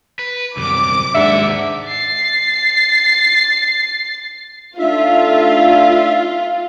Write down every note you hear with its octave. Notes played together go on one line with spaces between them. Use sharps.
B4
C2 F#2 D6
D#2 G#2 D4 E5 F#5
A6 C7
A3 D4 D#4 F4 E5